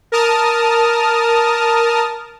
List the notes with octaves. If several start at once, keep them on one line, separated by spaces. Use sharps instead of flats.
A#4 A5 D#6 F6